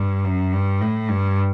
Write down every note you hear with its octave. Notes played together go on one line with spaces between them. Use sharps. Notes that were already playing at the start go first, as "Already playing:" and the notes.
Already playing: G2
F#2
G2
A2
G2